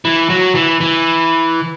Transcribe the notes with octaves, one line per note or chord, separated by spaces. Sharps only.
E3
F#3
E3
E3